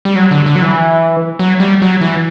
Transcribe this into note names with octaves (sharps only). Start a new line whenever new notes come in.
G3
F#3
D3
D3
F#3
E3
F#3
G3
F#3
E3